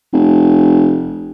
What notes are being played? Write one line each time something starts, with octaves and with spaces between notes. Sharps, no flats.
F1